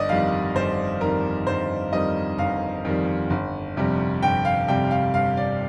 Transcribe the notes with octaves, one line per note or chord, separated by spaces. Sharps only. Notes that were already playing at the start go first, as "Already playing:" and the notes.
Already playing: G1 D5 D#5
F2 D#3 G3 F5
G1 C5
F2 D#3 G3 A#4
G1 C5
F2 D#3 G3 D#5
G1 F5
F2 D#3 G3
G1
F2 C3 G3
G1 G5
F5
F2 C3 G3 G5
F5
G1 F5
D5